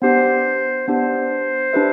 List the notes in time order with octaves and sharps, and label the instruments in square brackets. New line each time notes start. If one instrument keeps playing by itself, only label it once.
[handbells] B3 D4 G4 [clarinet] C5
[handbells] B3 D4 G4 [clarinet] C5
[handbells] D4 G4 B4 E5